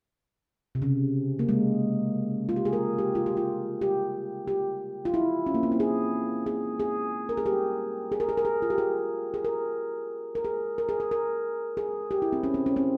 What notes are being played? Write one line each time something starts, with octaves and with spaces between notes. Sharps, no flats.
C3
C#3
A#3
G#3
F4
G4
G#4
A#4
G4
F4
G4
F4
G4
G4
F4
E4
C#4
A#3
C4
E4
G#4
G#4
G#4
A#4
G#4
G4
G#4
A#4
G#4
A#4
G#4
F4
G4
G#4
G#4
A#4
A#4
G#4
A#4
G#4
A#4
A#4
G#4
G4
E4
C4
C#4
C4
C#4
C4